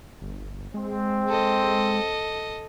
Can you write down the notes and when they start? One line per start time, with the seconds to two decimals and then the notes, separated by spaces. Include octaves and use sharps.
0.22 G1
0.74 G#3 C4
1.29 A4 D#5